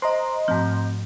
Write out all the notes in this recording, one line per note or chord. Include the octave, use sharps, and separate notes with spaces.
C5 D#5 A#5 C6
G#2 F3 A3 C4 G6